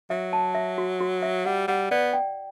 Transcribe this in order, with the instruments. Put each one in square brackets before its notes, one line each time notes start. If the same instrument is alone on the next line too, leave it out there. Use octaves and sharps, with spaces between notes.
[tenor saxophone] F#3 [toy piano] E5
[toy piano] A5
E5
F#4
F#4
E5
[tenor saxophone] G3 [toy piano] F#5
[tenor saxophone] G3 [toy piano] F#5
[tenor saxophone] B3 [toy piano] D5
[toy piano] G5